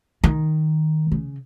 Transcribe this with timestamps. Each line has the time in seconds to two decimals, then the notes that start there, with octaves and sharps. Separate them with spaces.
0.24 D#3
1.12 C#3